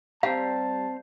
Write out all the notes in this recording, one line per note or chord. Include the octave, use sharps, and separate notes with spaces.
G3 C4 C5 F5 A5 A#5